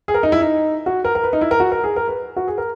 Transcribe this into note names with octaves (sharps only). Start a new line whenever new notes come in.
G#4
A#4
D#4
E4
D#4
F#4
A#4
A#4
B4
D#4
E4
A#4
F#4
A#4
G#4
A#4
B4
F#4
G#4
A#4